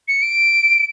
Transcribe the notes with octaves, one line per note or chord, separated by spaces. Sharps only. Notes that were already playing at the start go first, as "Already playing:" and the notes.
C#7
D7